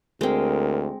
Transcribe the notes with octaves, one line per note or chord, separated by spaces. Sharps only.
D2 G#3 C4 A#4